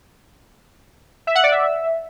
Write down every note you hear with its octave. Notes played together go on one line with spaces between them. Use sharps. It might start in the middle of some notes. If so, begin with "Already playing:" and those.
E5
F#5
D5
E5